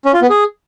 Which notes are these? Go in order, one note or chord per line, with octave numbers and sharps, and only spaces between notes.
C#4
F4
B3
G#4